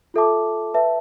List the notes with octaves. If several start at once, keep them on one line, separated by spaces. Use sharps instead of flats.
F4 A4 E5 A5 D6
B4 E5 A5